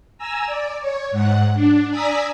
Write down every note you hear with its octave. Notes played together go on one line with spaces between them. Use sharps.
G#5 A#5 E6
D5
C#5
G#2 F#5
D4
D5 G#5 A#5 D#6 E6 B6